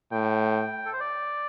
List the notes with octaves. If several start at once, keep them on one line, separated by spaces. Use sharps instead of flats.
A2 G5
A4
C5
D5